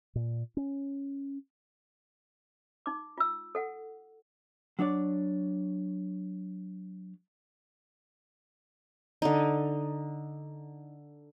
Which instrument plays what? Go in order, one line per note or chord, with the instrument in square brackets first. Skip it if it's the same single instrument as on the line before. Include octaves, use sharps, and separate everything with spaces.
[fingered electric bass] A#2
C#4
[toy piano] D#4 D6
F4 E6
A4 F#5
[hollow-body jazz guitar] F#3 D4 C#5 D5
[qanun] D3 D#4